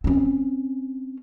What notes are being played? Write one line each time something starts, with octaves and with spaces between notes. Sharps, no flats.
C4 C#4